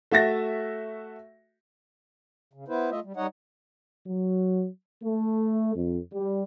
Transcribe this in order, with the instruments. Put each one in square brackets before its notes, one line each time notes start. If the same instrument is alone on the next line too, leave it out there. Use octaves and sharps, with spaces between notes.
[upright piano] A3 F#4 E5 A6 A#6
[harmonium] C#3
B3 E4 B4 C5
A3 F4 D#5 E5
G3
G3 D#4 C#5 D#5 F#5
[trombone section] F#3
A3
F2
G3